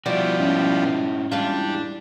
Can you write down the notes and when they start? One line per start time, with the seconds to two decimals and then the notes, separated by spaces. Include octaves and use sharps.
0.06 B2 D#3 F3 G3 E4 F#4 D5
0.40 G#2 C#4 E4 D#5
1.32 E2 G#2 G3 D4 F4